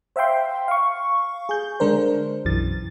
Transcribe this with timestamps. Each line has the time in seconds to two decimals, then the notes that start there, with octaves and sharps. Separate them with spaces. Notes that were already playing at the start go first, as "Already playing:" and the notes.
0.16 C5 E5 F5 G5 C6
0.68 F5 C#6
1.49 G#4 G6
1.80 D3 G#3 D4 A#4 C5
2.45 B1 F#2 E3 A6